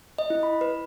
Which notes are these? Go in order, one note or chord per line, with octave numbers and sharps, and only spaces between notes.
D#5
E4
B5
B4